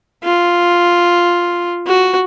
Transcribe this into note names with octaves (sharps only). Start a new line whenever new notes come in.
F4
F#4